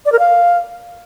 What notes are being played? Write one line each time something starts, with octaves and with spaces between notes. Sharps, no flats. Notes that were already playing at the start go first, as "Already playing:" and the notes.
D5
A#4
F5